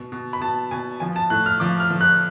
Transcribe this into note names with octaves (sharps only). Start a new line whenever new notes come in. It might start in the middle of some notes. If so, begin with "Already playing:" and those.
Already playing: B2
B2
B5
B2 A5
B2 G#5
F3 G#5
A5
A2 F#6
F6
F3 D6
F6
F3
F#6